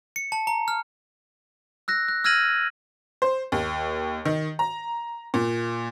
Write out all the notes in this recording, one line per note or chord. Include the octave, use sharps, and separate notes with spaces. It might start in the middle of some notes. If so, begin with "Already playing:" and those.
C#7
A5
A#5
F6
E6 F#6 A#6
F#6
E6 F6 G#6 A#6 D#7 F#7
C5
D#2
D#3
A#5
A#2